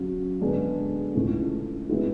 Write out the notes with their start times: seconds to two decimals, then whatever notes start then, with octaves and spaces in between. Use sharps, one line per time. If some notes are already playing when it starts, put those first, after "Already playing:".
Already playing: C#3 F#3 C#4 F#4
0.41 D3 G#3 B3 D4 G#4
1.15 C#2 C#3 E3 A3
1.89 C#3 G#3 B3 E4